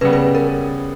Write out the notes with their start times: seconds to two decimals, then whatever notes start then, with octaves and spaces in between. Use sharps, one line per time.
0.01 C#3 G3 B3 B4
0.13 B4
0.35 A#4